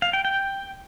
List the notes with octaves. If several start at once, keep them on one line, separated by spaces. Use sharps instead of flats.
F5
G5
G5